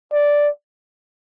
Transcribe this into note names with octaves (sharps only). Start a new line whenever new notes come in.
D5